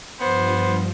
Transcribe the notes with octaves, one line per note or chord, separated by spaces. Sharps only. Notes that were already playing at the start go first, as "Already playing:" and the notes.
G2 F3 B3 C5